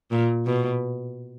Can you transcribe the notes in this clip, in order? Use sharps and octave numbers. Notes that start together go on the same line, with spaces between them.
A#2
B2